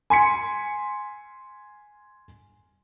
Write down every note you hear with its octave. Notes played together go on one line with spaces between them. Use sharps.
G#5 C6 B6 C#7